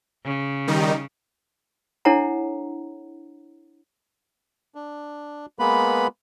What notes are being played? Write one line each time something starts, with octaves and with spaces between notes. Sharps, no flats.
C#3
D#3 G3 D#4
D4 E4 A4 C#5 F#5 A#5
D4
G#3 A#3 B3 B4 B5